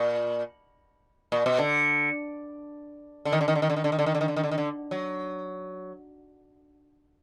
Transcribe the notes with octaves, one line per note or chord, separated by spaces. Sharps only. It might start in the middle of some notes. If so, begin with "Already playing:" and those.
Already playing: A#2
A#2
B2
D3
D3
D#3
D3
D#3
D3
D#3
D3
D#3
D3
D#3
D3
D#3
D3
D#3
D3
D#3
D3
D#3
D3
F#3